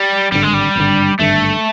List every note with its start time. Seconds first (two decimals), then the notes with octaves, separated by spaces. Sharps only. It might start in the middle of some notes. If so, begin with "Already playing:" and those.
Already playing: G3
0.32 G#1 G2 D3 G3
0.43 G#3
0.54 G3
0.76 G#1 G2 D3
1.19 G#1 G2 D3 A3